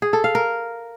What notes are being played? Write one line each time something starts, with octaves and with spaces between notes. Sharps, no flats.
G#4
A4
F5
A#4